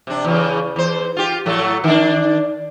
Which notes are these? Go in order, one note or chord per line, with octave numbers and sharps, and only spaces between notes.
C3 D4
E2 C#3
E2 C5
F4 G4
A2 F#3 A3
D#3 D4